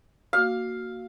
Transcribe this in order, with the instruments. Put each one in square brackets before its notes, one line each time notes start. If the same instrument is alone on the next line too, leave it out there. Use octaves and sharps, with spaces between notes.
[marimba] A#3 F#4 D6 [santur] F5